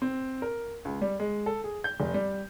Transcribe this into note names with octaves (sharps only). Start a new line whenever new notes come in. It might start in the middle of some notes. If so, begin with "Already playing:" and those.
C4
A#4
C#2
G3
G#3
A4
G#4
G6
F1
G3